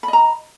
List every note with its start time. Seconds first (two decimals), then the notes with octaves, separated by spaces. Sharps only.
0.03 B5
0.08 D#5
0.13 A#5